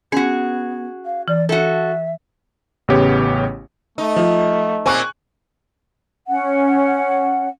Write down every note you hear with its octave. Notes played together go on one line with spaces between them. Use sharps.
B3 C#4 F#4 G#4
F5
E3 D5
F#4 A4 E5
A1 C#3 B3 G4 C#5
A3 D#4
F3
A#2 A#3 C4 G#5 C#6 F#6
C#4 F#5